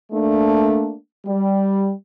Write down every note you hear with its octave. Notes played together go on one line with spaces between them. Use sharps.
A3 A#3 D4
G3